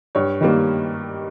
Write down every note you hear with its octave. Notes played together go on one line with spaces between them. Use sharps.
G2 C#5
D#3 G3 A#3